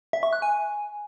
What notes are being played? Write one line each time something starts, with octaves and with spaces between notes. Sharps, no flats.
E5
C#6
F#6
G#5